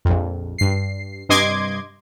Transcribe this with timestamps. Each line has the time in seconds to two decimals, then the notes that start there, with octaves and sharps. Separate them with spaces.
0.05 A#1 F2
0.58 G2 C7
1.29 G2 C3 D#5 C6 D6 G#6